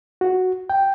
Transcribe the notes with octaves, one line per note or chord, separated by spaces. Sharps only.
F#4
G5